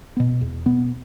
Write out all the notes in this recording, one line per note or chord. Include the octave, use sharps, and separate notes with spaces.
B2 B3
E2
B2 B3